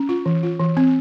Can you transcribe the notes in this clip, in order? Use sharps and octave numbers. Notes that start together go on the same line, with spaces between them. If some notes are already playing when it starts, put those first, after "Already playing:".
Already playing: C#4
F4
E3
F4
E3
C4